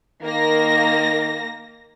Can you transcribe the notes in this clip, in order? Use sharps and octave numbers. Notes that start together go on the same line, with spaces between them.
D#3 A#3 A#6